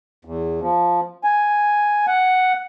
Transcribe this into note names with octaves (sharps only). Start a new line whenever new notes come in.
E2
F3
G#5
F#5